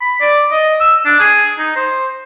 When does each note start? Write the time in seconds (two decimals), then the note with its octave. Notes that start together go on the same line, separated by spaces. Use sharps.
0.01 B5
0.21 D5
0.52 D#5
0.80 E6
1.06 D4
1.20 G#4
1.59 D#4
1.76 C5